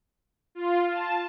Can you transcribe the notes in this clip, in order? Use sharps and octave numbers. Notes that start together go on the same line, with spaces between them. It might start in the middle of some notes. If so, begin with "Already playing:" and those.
F4
A5